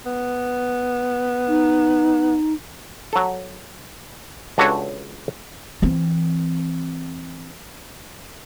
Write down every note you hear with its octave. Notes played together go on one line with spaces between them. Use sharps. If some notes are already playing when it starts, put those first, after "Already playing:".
B3
D#4
F#3 A4
C#2 D4 F#4 A4 B4 C#5
E3 C4